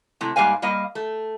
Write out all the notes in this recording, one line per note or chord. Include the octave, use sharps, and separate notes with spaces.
C3 A3 E4
G#2 G3 A#3 F5 G#5
G3 A#3 D#5 F5
A3